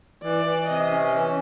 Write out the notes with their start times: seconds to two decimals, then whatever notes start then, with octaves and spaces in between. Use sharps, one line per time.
0.23 E3 D5
0.45 E3
0.68 C3 D#5
0.90 C#4
1.12 E3